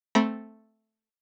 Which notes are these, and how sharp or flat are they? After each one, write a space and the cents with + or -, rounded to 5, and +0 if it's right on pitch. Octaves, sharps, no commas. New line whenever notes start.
A3 +0 C4 +0 B5 -40